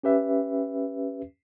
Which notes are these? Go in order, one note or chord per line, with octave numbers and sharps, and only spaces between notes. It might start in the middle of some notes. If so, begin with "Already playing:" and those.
C#4 G4 B4 E5